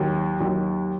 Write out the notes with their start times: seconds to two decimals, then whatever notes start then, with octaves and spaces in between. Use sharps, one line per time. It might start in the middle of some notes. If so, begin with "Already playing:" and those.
Already playing: D#2 D#3 F#3
0.40 D#2 D#3 F#3